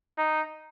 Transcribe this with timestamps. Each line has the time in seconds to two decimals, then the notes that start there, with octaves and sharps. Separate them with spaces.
0.18 D#4